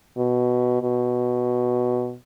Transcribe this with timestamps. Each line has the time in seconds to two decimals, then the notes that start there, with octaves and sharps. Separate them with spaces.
0.17 B2
0.81 B2